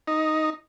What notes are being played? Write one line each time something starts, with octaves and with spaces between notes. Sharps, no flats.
D#4